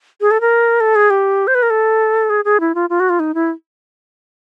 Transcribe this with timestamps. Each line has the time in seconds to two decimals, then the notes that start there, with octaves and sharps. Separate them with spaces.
0.21 G#4
0.31 A4
0.41 A#4
0.80 A4
0.95 G#4
1.10 G4
1.47 C5
1.55 B4
1.62 A#4
1.70 A4
2.30 G#4
2.45 G#4
2.60 E4
2.75 F4
2.90 F4
3.00 F#4
3.10 F4
3.20 D#4
3.34 E4